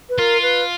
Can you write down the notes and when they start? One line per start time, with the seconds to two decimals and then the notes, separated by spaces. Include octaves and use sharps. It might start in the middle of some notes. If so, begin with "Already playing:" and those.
0.09 B4
0.18 F4 A#4
0.42 B4